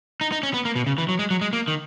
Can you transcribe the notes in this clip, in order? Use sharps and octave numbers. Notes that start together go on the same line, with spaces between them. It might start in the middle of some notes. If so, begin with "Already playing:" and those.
D#4
D#4
C#4
B3
A#3
B2
C#3
E3
F#3
G#3
F#3
G#3
A#3
D#3